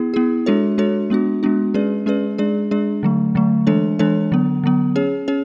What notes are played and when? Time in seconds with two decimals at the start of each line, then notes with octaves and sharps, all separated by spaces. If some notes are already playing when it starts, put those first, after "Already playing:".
Already playing: B3 E4 G#4
0.14 B3 E4 G#4
0.46 G#3 D4 F#4 A4 C#5
0.78 G#3 D4 F#4 A4 C#5
1.10 G#3 B3 D4 F#4
1.43 G#3 B3 D4 F#4
1.74 G#3 C#4 G#4 B4 D5
2.06 G#3 C#4 G#4 B4 D5
2.38 G#3 D4 G#4 D5
2.71 G#3 D4 G#4 D5
3.03 D3 F#3 A3
3.35 D3 F#3 A3
3.67 E3 G#3 D4 A4 C#5
3.99 E3 G#3 D4 A4 C#5
4.32 D3 F#3 B3
4.64 D3 F#3 B3
4.96 C#4 G#4 C#5
5.28 C#4 G#4 C#5